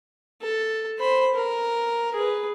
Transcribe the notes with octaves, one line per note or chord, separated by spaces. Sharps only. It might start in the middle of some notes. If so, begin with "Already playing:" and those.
A4
C5 B5
A#4
G#4 B4